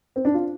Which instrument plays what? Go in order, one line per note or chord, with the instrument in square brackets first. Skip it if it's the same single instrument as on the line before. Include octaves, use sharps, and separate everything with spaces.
[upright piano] C4
D4
F4